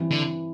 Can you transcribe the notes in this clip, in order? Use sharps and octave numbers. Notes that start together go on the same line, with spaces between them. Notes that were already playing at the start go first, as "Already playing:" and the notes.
Already playing: G2 E3 C4
D3